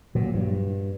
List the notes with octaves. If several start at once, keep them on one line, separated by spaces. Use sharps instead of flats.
A#2 F#3
G2